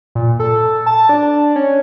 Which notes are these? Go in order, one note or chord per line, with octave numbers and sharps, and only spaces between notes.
A#2
A4
A5
D4
C#4